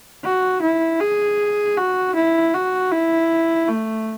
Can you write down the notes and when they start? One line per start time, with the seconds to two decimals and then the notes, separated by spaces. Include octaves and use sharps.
0.24 F#4
0.62 E4
1.01 G#4
1.77 F#4
2.16 E4
2.54 F#4
2.92 E4
3.68 A3